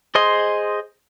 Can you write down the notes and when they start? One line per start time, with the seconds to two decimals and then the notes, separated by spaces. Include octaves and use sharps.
0.15 G#4 C5 D#5 C6